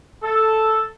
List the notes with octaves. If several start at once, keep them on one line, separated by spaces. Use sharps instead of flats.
A4